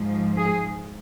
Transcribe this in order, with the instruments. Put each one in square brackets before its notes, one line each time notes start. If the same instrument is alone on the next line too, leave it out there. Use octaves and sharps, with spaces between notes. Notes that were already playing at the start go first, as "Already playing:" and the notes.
Already playing: [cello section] G#2 F3
G#4